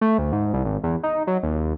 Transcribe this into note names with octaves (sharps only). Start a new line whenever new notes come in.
A3
D2
G#2
C2
G#1
E2
D#4
F#3
D#2